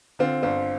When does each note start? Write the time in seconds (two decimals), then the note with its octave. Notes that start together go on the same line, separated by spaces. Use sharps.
0.19 D3 C4 F4
0.43 G1 C4 F4